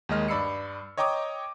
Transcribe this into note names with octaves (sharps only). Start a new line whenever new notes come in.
D#2 D#3 G#3 D#5 F6
G2 D5 B5 E6 C7 C#7
C#5 D#5 G5 A#5 D6 D#6